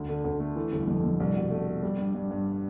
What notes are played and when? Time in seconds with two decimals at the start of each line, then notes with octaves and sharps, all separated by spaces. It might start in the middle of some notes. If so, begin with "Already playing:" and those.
Already playing: D2
0.09 D3
0.24 D2
0.40 A3
0.56 E3
0.72 G1
0.88 F2
1.04 F2
1.20 C2
1.36 B2
1.51 A3
1.67 A3
1.83 G3
1.98 G2
2.15 G2
2.31 G2